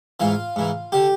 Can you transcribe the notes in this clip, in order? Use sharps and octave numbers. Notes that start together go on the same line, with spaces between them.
G#2 E3 F4
G#2 E3
D3 G4